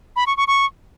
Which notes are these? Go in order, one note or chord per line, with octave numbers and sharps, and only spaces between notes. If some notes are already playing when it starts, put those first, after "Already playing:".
B5
C#6
C#6
C#6